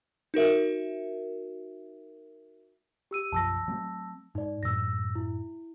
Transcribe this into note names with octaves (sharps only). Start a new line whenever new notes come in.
D#4 F#4 A#4 E5
G4 E6 D#7
B1 F#2 F3 A5 E6 A#6
F#3 A3 C4
G#2 D#4 D5
F#2 A2 F#3 E6 A#6
E4